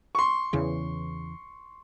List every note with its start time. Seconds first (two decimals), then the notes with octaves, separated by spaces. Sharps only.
0.15 C6 C#6
0.53 E2 C#3 E3